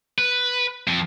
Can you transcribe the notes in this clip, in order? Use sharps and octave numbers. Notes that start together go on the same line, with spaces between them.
B4
F2